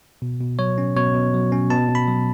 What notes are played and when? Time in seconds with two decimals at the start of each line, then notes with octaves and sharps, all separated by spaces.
0.22 B2
0.40 B2
0.59 F#3 C#5
0.78 C#4
0.96 B2 C#5
1.14 B2
1.34 F#3
1.52 C#4
1.70 B2 A5
1.89 B2
1.95 B5
2.08 F#3